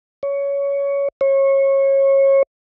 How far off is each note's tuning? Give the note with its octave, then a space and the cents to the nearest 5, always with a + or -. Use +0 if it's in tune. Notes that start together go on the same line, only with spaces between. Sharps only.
C#5 +15
C#5 -25